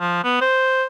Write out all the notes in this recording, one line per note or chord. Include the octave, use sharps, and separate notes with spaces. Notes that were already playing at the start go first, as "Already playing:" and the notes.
F3
B3
C5